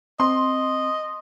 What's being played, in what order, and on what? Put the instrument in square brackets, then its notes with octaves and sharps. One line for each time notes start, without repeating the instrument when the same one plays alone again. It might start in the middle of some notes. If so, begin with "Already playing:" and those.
[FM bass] C4 [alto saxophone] D#5 [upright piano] C6